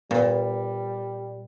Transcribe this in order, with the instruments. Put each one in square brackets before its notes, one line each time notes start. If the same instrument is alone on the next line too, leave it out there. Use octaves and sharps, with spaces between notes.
[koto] A#2 [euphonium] G3 [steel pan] B3